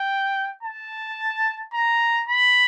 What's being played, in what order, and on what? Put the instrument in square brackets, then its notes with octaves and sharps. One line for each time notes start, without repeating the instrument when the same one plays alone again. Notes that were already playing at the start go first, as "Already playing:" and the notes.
Already playing: [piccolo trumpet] G5
A5
A#5
B5